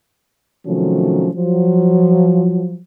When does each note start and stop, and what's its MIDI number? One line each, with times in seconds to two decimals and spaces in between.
0.66 1.29 48
0.66 1.29 51
0.66 1.29 53
0.66 1.29 54
0.66 1.29 57
0.66 1.29 61
1.35 2.78 53
1.35 2.78 54